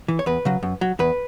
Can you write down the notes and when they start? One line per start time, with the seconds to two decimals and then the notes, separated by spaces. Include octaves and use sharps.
0.08 E3
0.19 C#5
0.26 E2 B4
0.45 C#3 F#3
0.63 F#2
0.81 F#3
0.99 E2 B4